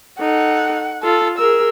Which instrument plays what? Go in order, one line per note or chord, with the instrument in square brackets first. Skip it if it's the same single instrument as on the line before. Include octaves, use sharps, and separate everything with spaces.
[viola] D#4 A4 [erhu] F#5
[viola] F4 [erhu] A4
[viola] G#4 A#4 [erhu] E6